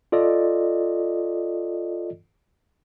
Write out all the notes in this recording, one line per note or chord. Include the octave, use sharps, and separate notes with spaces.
F4 A4 D5 D#5